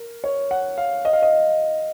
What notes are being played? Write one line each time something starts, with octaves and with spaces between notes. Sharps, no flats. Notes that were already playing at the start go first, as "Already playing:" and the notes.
Already playing: A#4
C#5
F#5
F5
D#5
F5
D#5